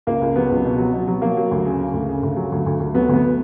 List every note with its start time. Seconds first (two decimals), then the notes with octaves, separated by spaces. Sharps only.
0.07 C#2 A#3
0.21 C#2
0.36 F#3 B3
0.51 C#2
0.64 B2
0.78 F#3
0.93 B2
1.07 F#3
1.22 F#3 A#3
1.37 F#3
1.51 D2
1.65 C#3
1.79 C#3
1.94 D2
2.08 C#3
2.23 D2
2.37 F#3
2.52 D2
2.66 D2
2.80 D2
2.94 F#3 B3
3.09 D2 B3